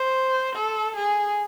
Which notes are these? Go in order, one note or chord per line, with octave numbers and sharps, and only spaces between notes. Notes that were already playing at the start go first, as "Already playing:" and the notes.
Already playing: C5
A4
G#4